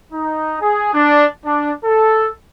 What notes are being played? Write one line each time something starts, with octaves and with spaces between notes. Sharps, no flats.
D#4
G#4
D4
D4
A4